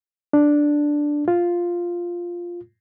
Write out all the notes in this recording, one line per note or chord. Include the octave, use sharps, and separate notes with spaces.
D4
F4